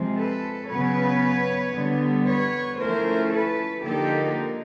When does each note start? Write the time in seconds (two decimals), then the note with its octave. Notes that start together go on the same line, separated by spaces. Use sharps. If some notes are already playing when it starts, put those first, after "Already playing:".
Already playing: C3 F3 G#3 C4
0.17 A4 B4
0.69 C#3 F#3 B3 B4 C#5
1.73 D3 G3 B3
2.26 B4 C#5
2.78 F3 A3 C#4 E4 A#4 C5
3.31 A4 B4
3.83 D3 F3 A#3 D#4 G4 A4